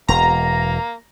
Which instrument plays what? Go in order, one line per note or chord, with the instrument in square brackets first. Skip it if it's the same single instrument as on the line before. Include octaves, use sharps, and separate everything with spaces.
[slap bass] E1 [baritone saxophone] A#3 [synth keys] A#5